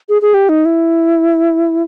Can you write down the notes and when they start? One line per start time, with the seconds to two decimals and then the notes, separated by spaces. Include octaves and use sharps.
0.09 G#4
0.22 G#4
0.34 G4
0.49 D#4
0.65 E4